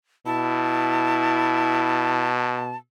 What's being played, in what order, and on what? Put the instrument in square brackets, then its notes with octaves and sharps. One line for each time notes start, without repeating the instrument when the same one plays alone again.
[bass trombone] B2 [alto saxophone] E4 [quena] A5